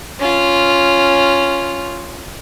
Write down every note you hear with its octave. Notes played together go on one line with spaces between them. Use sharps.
C#4 F4